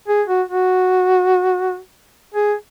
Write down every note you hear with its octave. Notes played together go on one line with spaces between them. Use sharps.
G#4
F#4
F#4
G#4